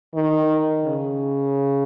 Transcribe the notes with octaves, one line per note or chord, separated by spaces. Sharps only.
D#3
C#3